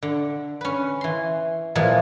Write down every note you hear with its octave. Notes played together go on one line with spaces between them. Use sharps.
D3
C#4 B4
E3 C6
A#2 E3 F3 G#3